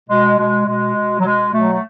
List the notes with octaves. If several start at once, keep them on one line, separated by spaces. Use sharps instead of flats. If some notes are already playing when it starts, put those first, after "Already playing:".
B2 G#3
B2 G#3
B2 G#3
B2
F#3
B2 G#3
B2 F#3 A3
A3